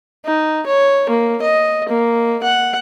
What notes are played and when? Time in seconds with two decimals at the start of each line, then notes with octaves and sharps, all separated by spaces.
0.25 D#4
0.66 C#5
1.10 A#3
1.42 D#5
1.89 A#3
2.43 F#5